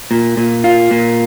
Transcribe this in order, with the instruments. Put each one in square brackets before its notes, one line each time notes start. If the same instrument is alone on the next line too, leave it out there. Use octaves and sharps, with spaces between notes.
[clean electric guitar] A#2
A#2
F4
A#2